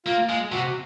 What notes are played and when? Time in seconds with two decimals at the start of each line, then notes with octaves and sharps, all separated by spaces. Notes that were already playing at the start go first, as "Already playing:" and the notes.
0.06 A#3 F4
0.29 G#3
0.52 C3 F#4